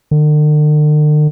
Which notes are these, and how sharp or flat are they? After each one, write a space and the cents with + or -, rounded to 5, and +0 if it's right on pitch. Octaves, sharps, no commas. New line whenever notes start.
D3 +45